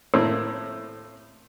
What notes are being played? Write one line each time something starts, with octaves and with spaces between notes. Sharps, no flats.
A2 A#3 C4